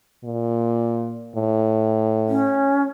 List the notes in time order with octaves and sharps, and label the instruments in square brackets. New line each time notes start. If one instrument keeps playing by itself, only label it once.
[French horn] A#2
A2
[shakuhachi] C#4